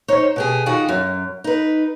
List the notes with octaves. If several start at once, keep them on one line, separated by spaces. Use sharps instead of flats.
D#4 C5 C#5
B2 G4 G#4
D#3 F4 F#4 G#4
F#2
D#4 B4